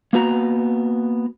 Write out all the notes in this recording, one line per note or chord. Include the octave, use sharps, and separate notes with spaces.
A#3 B3 F#4 A#5